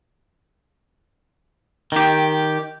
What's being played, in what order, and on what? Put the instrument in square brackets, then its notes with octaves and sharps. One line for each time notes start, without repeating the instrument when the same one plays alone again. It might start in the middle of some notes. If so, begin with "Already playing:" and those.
[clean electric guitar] D#3 G4